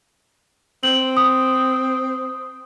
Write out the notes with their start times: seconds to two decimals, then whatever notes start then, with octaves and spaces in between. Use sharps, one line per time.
0.83 C4 F#7
1.17 D#6